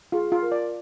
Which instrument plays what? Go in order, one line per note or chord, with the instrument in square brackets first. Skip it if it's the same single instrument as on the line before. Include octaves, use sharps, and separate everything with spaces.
[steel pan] F4 [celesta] G#4
[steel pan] F4
[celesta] A#4
[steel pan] D5